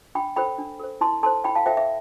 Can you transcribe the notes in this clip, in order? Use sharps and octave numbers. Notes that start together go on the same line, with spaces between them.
D4 G5 B5
A4 C5 G5 B5
D4
A4 C5
E4 A5 C6
A4 C5 A5 C6
E4 G5 B5
F5 A5
A4 C5 E5 G5
E5